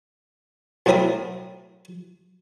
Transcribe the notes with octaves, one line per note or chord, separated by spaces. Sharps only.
B1 A2 C4 A#4 B5 D#6